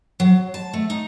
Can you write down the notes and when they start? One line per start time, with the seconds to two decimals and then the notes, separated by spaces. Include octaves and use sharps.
0.20 F#3
0.54 A5
0.74 A3
0.90 D#4